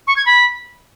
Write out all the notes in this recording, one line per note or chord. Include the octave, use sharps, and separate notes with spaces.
C#6
G#6
B5